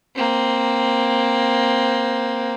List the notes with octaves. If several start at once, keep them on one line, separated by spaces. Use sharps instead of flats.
A#3 C4